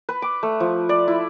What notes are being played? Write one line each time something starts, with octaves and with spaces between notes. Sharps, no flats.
B4
D6
A3
F3
D5
E4